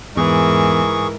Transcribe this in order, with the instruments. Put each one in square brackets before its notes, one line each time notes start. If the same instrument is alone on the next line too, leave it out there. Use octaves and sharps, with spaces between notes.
[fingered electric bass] E2 [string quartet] G#2 A#4 [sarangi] E3 [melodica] G#4 C#6